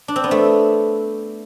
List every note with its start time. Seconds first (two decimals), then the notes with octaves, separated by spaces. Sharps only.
0.08 D4
0.16 C4
0.24 B3
0.31 A3